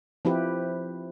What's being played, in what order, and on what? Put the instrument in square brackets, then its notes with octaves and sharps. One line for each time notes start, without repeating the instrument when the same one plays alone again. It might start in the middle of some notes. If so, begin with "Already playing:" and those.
[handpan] F3 C4 E4 G4 B4